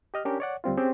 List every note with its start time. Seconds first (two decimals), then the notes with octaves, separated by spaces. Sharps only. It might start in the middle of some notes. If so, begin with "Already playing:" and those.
0.14 G4 D#5 F6
0.25 C#4 D4 G4 A#4
0.40 C#5 D5 F#5
0.64 D2 G3 C4 F4
0.77 C4 C#4 G4 G#4